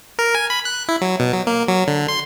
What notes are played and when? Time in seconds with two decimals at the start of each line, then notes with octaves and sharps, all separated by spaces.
0.19 A#4
0.35 G#5
0.50 B5
0.65 F#6
0.88 E4
1.01 F#3
1.20 B2
1.33 F#3
1.47 A#3
1.68 F#3
1.88 D3
2.08 C6